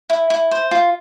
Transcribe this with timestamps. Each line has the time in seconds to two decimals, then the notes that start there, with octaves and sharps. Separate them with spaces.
0.10 E4
0.30 E4
0.51 C5
0.71 F4